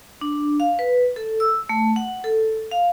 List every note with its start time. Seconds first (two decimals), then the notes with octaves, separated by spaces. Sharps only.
0.21 D4
0.60 F5
0.79 B4
1.16 A4
1.40 E6
1.69 A3
1.96 F#5
2.24 A4
2.71 F5